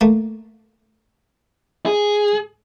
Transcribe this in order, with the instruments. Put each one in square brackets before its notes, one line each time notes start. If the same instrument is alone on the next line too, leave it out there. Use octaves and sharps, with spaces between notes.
[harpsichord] A3 A#3
[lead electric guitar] G#4